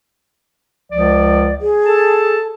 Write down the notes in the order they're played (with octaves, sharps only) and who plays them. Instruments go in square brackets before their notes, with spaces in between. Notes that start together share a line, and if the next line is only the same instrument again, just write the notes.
[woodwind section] C#2 F3 D5
[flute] G#4
[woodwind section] A4 A5